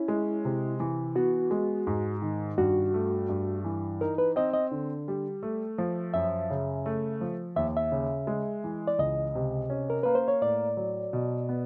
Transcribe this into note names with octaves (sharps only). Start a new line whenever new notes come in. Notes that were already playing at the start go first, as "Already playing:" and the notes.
Already playing: C#4 E4
G#3
C3
E3
B3 F#4
G#3
G#2
D#3
G2 F#4
A3
G2
E3
D#4 A#4
B4
C4 D#5
D#5
D3
G3
A3
F3
F#2 E5
C#3
A3
F3
D#2 E5
E5
C#3
G#3
E3
D5
C#2 D#5
C3
C#4
A#4
A#3 B4
C5
C#5
A2 D5
F#3
B2
B3